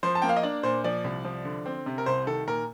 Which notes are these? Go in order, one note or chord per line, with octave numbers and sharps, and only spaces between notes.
F3 C5
A5
A#3 G5
F5
D#5
D4 D5
A#2 C5
F3 D5
C2
F3
D3
C4
C3
A#4
C2 C5
D#3 A4
A#2 A#4